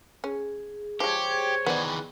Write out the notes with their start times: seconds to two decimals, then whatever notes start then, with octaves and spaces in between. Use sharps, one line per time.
0.24 C#4 G#4
1.00 F3 G#3 G4 C5 C#5
1.66 D#3 E3 B3 D5